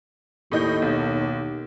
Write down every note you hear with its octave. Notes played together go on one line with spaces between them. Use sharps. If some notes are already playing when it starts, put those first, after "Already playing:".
D#2 A2 D#5 G6
B1